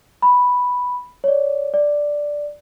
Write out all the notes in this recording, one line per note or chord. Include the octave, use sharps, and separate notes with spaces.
B5
C#5 D5
D5